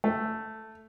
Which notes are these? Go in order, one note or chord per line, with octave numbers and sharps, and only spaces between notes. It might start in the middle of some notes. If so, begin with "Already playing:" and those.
A3